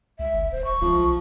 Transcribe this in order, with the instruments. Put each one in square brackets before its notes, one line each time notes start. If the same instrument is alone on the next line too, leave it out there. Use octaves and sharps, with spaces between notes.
[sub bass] C#2 [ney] E5
[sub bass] G1
[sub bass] D1 [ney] C5
[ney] C#6
[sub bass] C#2 [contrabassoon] F3
[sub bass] B1